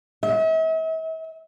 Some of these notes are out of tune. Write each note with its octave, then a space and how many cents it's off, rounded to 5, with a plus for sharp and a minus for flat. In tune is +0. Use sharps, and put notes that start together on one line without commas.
E5 -45